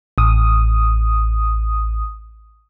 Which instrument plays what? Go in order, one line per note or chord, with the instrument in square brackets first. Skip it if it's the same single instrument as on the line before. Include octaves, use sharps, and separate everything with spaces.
[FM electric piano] A1 D#6